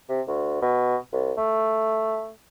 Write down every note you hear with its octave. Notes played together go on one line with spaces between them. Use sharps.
C3
D2
B2
C2
A3